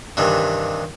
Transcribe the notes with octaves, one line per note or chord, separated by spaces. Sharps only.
G2 C3 D#3 E3